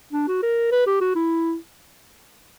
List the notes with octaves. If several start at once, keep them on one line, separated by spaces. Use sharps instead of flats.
D4
F#4
A#4
B4
G4
F#4
E4